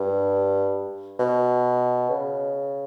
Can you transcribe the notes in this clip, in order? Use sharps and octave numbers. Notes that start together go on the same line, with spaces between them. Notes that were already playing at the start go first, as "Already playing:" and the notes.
Already playing: G2
B2
C#3